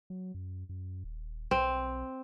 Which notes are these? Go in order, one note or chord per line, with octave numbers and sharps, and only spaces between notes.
F#3
F#2
F#2
D#1
B1 C4